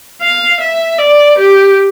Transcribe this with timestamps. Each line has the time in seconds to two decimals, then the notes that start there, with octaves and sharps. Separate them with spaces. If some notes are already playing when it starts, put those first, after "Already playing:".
0.21 F5
0.60 E5
0.98 D5
1.38 G4